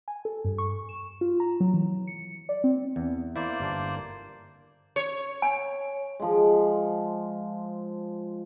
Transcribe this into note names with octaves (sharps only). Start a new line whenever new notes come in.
G#5
A4
G2
C#6
E7
F4
A#5
F#3
E3
C#7
D5
C4
E2
A#3 E4 C5 D5
G1 D4
C#5
G#5
F3 G#3